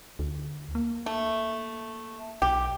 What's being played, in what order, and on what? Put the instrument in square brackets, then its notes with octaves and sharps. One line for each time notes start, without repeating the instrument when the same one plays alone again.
[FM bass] D2
A#3
[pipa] A3
[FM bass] B1 [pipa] G4